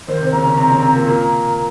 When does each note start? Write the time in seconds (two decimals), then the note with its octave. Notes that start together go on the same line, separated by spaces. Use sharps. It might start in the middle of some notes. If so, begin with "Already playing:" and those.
0.08 D#2 D#3 C5
0.20 C3 C4
0.33 C#3 C#4 A#5
0.45 C#3 C#4
0.57 C3 C4 A#5
0.69 C#3 C#4
0.82 C3 C4
0.94 A#2 A#3
1.07 A#2 A#3 A#5